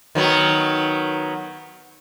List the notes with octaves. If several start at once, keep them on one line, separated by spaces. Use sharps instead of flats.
D#3 F#3 B3